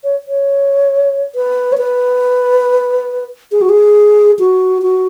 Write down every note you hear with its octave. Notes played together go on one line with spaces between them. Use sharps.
C#5
C#5
B4
C#5
B4
G#4
F#4
G#4
F#4
F#4